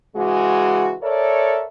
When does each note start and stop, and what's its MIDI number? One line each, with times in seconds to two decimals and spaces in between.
0.16 0.94 49
0.16 0.94 52
0.16 0.94 56
0.16 0.94 66
1.02 1.63 69
1.02 1.63 70
1.02 1.63 73
1.02 1.63 74
1.02 1.63 76